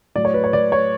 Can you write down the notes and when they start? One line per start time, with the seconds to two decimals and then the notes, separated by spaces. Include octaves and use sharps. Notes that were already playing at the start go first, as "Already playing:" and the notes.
0.15 A2 F#3 D5
0.25 C#5
0.34 B4
0.44 C#5
0.53 D5
0.72 C#5